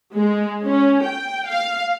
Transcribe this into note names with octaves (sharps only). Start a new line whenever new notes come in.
G#3
C#4
G5
F5